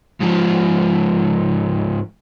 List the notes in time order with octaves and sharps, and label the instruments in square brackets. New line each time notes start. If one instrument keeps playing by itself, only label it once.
[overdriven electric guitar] G#2 F3